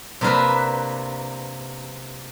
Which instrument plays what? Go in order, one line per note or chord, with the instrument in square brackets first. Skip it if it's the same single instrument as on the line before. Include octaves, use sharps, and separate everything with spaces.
[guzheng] C3 A#3 D4 A#4 B4